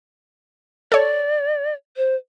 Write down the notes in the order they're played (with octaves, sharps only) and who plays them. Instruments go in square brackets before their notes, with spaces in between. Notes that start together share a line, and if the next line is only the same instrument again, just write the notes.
[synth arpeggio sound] A4 C#5 [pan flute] D5
[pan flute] C5